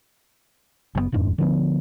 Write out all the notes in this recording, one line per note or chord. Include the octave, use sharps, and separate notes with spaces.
F#1 D3 B3
D#1 F2 G#2 D4
D3 F3 B3